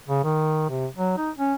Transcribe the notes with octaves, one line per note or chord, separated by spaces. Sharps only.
C#3
D#3
C3
F#3
D#4
C#4